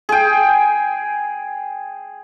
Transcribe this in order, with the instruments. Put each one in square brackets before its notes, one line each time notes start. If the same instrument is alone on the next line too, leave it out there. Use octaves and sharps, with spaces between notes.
[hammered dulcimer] G#4 G5